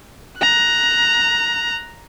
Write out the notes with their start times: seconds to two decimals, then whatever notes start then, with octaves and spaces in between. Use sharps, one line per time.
0.39 A#5 F#6